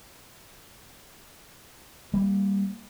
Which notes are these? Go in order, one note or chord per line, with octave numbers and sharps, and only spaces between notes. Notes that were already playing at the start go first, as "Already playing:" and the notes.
G3 A#3